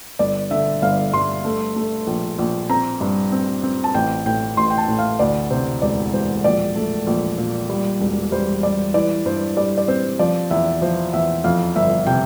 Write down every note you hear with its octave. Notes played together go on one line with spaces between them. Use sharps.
G1 D5
D3 E5
G1 F5
G2 C6
A3
A3
A#1
A#1
C4 A#5
G2
C4
C4
A5
A1 G5
A2 G5
A1 C6
G5
A5
A2
F5
D2 D5
C3 C5
E1 D5
E1 C5
A#1 D5
A3
A#1
A#2
G3
E1
G3 C5
G3 D5
E3 D5
G2 C5
G3 D5
D5
C4 C5
F3 D5
E2 E5
F3 C5
E2 E5
F2 F5
G1 E5
C3 G5